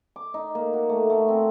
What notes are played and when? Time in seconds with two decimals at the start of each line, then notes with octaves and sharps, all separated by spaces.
0.16 D6
0.34 D#4
0.55 A#3
0.73 F#4
0.89 A3
1.10 A3
1.28 C4